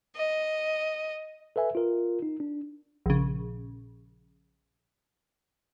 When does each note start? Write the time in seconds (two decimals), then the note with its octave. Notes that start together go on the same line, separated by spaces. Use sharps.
0.13 D#5
1.56 A4 B4 E5 G#5
1.75 F4 A#4
2.22 D#4
2.40 D4
3.06 A#1 C#3